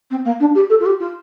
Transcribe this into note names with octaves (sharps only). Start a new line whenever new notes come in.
C4
A#3
D4
G4
A4
F4
G4
F4